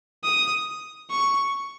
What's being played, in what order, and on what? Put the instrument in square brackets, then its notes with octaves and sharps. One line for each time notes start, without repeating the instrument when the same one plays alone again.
[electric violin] D#6
C#6